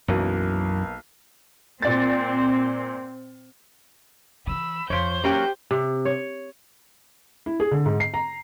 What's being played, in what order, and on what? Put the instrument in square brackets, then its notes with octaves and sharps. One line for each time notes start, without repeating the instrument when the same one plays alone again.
[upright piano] B1 A#3 [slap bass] F#2 E3
[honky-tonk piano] A#2 D5 A6 [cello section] C4
[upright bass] D#3 E3 [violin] B5 E6
[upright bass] F2 [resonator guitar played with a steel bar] F3 C#5 [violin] C5 G6
[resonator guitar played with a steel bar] F#3 A#3 C#4 [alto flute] G4
[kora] C3
C#5
[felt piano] E4
G#4
D3
G#2
C7
A#5